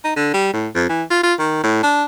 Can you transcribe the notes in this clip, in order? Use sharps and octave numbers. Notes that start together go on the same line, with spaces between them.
D#4
D3
G3
A2
F2
E3
F4
F4
D#3
A2
D4